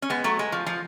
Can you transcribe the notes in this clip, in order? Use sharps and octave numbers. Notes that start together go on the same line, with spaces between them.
C#4
G#3 B3
F#3 A3
G#3
F3
F3